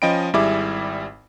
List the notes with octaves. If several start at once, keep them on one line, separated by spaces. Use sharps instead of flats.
F3 C#4 D#5 G5 B5 D7
G#1 G3 E4 G#4 E5 D6